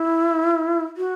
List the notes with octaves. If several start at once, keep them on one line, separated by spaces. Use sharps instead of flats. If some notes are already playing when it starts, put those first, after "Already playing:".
Already playing: E4
F#4